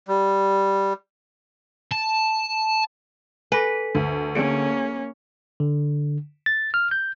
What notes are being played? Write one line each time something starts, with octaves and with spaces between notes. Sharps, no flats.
G3
A5
A4 B4 G#5
D2
A#3 C#4 G#4 C#7 D7
D3
A6
F6
G6